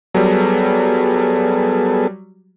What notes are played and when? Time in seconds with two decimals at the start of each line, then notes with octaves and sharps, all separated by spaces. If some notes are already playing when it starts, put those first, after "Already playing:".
0.14 F#3 G3 B3 G#4 A4